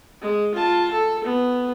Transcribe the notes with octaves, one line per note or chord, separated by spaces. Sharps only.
G#3
F4 A5
A4
B3